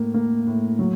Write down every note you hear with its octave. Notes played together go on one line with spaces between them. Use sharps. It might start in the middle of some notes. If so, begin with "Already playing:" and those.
Already playing: A2 A#3
A#3
A2
F#3